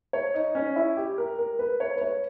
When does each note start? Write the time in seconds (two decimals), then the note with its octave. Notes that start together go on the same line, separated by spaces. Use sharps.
0.13 C#5
0.34 D#4
0.55 C#4
0.76 E4
0.97 G4
1.18 A#4
1.39 A#4
1.59 B4
1.80 C#5
1.96 B4
2.01 C#5